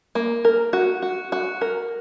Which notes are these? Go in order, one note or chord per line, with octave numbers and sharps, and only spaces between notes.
A#3
A#4
F#4
F#4
F#4
A#4